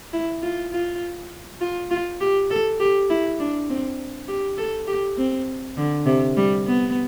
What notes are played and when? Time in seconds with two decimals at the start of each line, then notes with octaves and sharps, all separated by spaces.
0.13 E4
0.42 F4
0.71 F4
1.61 F4
1.91 F4
2.21 G4
2.51 A4
2.80 G4
3.10 E4
3.39 D4
3.69 C4
4.28 G4
4.58 A4
4.87 G4
5.17 C4
5.77 D3
6.06 C3
6.37 G3
6.66 B3